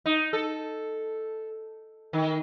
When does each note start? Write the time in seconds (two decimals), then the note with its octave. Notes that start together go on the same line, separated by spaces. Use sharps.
0.06 D#4
0.33 A4
2.13 D#3